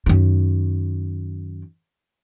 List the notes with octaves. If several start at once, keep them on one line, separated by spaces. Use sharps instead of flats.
F#2 D#3